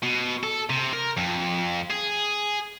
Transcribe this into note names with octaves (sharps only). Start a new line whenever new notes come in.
B2
A4
C3
A#4
F2
G#4